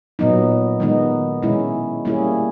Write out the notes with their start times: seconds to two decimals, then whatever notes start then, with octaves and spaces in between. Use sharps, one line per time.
0.19 A#2 F#3 B3 D#4
0.80 D#3 G#3 B3 D#4
1.43 B2 G#3 C#4 E4
2.05 G3 A#3 C#4 E4 G#4